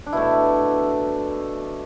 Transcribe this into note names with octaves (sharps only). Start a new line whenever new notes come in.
D4
B2 A3 E4